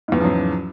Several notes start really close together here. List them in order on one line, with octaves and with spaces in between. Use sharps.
G#2 E2 C#3 F3 F#3